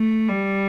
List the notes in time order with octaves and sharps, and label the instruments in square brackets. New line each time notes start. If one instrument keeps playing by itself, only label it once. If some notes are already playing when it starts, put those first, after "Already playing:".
Already playing: [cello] A3
G3